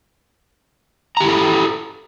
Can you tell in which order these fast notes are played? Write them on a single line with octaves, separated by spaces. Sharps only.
A#5 G4 E4 A4